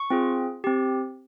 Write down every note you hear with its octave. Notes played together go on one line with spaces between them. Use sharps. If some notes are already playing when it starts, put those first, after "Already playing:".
Already playing: C#6
C4 F4 G#4
C4 G4